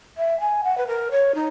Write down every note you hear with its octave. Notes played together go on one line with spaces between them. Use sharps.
E5
G#5
F#5
B4
A#4
C#5
D#4